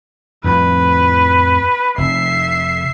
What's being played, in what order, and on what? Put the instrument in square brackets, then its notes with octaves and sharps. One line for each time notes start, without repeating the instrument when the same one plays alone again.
[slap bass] F2 A2 F3 [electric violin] B4
[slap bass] F1 [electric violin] E5 C7